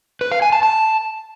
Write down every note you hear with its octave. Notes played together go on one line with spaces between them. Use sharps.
B4
F5
G#5
A5
A5